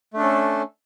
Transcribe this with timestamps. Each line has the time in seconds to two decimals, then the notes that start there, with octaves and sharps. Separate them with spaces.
0.14 A3
0.16 D4
0.19 A4
0.22 C#4